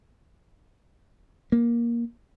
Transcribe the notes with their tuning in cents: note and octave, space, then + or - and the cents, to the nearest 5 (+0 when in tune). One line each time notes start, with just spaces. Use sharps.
A#3 +15